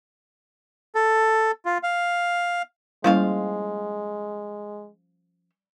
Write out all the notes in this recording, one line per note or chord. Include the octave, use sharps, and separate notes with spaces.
A4
F4
F5
F3 G3 G#3 A#3 C#4 E4 F5